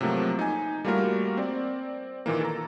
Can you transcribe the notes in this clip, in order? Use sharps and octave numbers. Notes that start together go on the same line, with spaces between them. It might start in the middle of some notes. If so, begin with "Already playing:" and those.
C3 F3 F#3 A3 A#3
D#4 G#5
G3 A3 A#3 F4 F#4 A#4
C4 D5
A#2 D#3 E3 A#3
A4 A#5